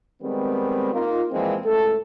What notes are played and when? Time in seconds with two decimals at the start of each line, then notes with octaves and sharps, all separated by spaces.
0.22 D#3 G3 G#3 B3 C4
0.93 A#3 D#4 F4
1.31 A#2 E3 F3 G#3 C4
1.64 C#2 A2 A3 A4